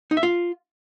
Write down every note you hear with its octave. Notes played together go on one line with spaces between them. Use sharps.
D#4
E5
F4